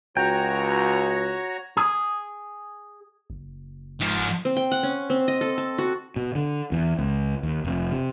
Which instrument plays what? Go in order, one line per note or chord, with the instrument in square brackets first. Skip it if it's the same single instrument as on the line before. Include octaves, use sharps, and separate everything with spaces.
[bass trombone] C#2 [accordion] F#4 C#5 A#5 [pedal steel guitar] G5
[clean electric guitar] G#4
[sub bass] F#1
[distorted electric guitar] G#2 F3
[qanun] C4
G5
F#5
C#4
C4
D#5
A4
A5
F#4
[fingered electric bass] B2
D3
E2
C#2
D#2
F1
C3